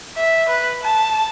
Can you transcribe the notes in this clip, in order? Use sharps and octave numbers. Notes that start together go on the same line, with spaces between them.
E5
B4
A5